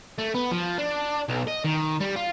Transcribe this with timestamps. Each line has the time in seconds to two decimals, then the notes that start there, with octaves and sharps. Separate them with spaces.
0.18 A3
0.35 B3
0.51 F3
0.78 D4
1.29 B1
1.47 D#5
1.64 D#3
2.01 G3
2.16 F4